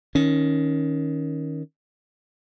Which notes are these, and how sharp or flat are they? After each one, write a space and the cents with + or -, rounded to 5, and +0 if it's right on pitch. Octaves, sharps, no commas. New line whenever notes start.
D#3 +10 C#4 +0